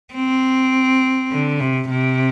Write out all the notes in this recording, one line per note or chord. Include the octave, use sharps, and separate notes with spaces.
C4
D3
C3
C3